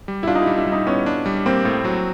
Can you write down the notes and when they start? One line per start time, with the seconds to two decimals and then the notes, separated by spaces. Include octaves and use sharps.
0.08 G3
0.23 E4
0.27 D4 F4
0.35 D#4
0.42 E4
0.47 G3
0.57 E4
0.66 G3
0.72 D#4
0.87 B3 C#4
1.06 D4
1.26 G3
1.46 A#3 C4
1.65 A2
1.85 F#3